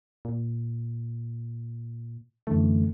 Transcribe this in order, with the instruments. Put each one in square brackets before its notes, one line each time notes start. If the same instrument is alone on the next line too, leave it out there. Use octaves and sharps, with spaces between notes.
[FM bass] A#2
[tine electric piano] F#2 D3 E3 [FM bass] A3